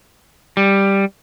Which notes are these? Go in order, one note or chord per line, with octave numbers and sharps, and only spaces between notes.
G3